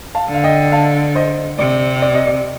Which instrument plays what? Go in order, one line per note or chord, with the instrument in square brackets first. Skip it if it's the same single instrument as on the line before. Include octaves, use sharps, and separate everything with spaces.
[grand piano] F5 A5
[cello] D3
[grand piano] F5
D#5 G5
F5 A5
C5 D#5
[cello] C3 [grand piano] D5
[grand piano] D5
D#5
D5